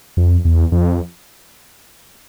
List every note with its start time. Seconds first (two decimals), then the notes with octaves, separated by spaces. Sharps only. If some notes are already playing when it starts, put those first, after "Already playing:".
0.17 F2
0.45 E2
0.72 F2